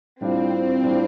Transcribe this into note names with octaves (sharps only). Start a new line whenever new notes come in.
A2 G3 C4 D4 F4
A2 G3 D4 F4